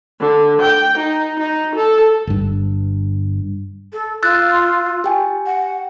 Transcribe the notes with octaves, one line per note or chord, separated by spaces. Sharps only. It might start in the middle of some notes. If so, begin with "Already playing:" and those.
D3
G5
D#4
D#4
A4
G1 G2
A4
F4 E6 F#6 A6
G4 G5 G#5
F#5